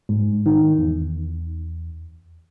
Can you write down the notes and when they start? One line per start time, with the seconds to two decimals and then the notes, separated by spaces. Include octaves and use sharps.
0.09 G#2
0.46 D#3
0.79 E2